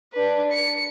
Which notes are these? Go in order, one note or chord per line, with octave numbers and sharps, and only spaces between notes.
D4 B4
C#7